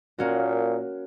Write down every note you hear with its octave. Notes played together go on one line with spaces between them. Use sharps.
A#2 A#3 C#4 F#4